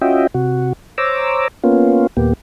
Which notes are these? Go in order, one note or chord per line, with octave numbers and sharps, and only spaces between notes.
C#4 F4 F#4 D#5 E5 G5
C3 F#4
C5 C#5 A#5 D6 E6
A#3 B3 C#4 F4
D#2 A#2 A#3 B3 G4